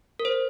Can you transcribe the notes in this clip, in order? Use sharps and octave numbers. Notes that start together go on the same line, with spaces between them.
A#4
C5